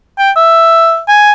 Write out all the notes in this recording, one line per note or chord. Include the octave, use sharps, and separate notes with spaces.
G5
E5
G#5